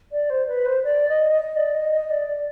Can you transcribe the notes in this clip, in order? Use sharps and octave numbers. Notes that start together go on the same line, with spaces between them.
D5
C5
B4
C5
D5
D#5
D#5
D5
D#5
D#5
D5
D5